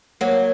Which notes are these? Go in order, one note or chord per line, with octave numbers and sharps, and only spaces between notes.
F#3 A#3